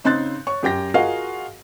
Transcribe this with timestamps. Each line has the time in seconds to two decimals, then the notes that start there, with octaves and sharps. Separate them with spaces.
0.04 C#3 C4 D#4 C6 F#6 A6
0.47 C#5 C#6
0.63 F#2 G4 G5 A#6
0.94 F4 F#4 G#4 A#4 D#5 F5